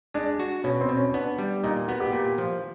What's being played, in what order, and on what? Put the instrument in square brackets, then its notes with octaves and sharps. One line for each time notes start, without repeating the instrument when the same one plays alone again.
[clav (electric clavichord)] G#3 [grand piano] D4
[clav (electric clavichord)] F#4
[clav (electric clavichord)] B2 [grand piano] C#4
[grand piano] C4
[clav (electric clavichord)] B2
[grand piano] C#4
[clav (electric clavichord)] B3 [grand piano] D4
[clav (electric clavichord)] G3
[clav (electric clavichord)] A#2 [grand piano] D#4
[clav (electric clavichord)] B3 [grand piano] F#4
[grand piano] G4
[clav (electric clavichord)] A#2
F3